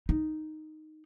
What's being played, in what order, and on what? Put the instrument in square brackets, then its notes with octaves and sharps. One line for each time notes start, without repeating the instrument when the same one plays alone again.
[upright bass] D#4